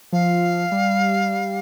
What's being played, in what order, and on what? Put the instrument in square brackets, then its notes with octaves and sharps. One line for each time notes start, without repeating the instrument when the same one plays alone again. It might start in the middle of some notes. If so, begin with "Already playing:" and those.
[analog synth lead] F3 [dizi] F5
[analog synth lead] G3